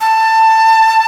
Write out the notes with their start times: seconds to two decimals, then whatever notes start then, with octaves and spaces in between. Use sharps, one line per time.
0.01 A5